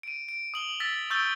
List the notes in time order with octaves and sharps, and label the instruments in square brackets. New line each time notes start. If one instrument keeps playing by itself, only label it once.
[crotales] D7 D#7
D7
D#6 F#7 G7
E6 A6 B6
C#6 E6 G6 A6 D7 G7